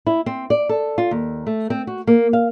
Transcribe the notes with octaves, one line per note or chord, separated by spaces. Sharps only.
E4
C4
D5
A4
F4
D#2
A3
C4
F#4
A#3
F5